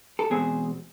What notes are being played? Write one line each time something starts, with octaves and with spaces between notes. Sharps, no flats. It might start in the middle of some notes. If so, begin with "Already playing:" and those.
A4
E2 B2 G#3 C4 G#4